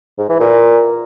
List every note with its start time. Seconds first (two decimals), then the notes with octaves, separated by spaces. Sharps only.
0.18 G#2
0.29 E3
0.40 A#2